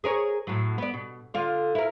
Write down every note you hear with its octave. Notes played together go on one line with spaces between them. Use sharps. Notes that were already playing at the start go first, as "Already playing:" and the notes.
G#4 A#4 C#5
A2 F#3
B3 D5
B2
D3 F4
E4 A#4